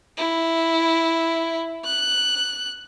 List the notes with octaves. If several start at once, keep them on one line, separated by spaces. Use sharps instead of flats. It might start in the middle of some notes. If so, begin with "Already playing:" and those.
E4
F#6